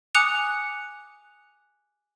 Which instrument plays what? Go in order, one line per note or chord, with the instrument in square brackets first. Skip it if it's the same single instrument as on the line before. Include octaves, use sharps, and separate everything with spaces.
[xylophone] G#5 D6 D#6 F#6 C#7 F7